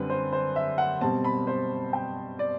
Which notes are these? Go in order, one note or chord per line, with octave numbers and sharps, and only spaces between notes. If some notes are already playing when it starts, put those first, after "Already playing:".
Already playing: F#2 D3 G3 C4 B4
C5
C5
E5
F#5
B2 G3 C4 A5
B5
C5
G5
D5